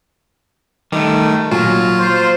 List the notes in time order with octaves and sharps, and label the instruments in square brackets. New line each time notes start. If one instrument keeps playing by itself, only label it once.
[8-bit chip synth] D#3 [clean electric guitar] G3 A3
[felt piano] A#2 F#4 [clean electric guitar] F#3 [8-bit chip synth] F4
[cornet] C5